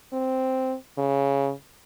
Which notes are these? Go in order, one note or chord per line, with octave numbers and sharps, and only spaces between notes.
C4
C#3